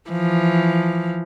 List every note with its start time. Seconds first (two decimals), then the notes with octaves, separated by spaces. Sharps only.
0.10 E3 F3